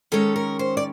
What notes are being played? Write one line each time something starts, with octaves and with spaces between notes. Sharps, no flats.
D#3 G#3 C#4 A4
A#4
C5
D5